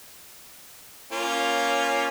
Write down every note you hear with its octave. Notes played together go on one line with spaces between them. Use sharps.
A#3 C#4 F4